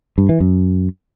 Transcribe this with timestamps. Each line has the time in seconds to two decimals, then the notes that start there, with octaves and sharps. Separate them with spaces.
0.18 G2
0.29 E3
0.40 F#2